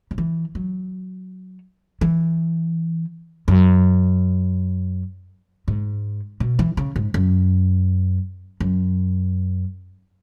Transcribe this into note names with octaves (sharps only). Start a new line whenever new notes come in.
C#3
E3
F#3
E3
F#2
G#2
B2
E3
C#3
G#2
F#2
F#2